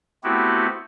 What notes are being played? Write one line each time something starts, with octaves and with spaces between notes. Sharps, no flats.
A3 B3 C4 E4 F#4 G4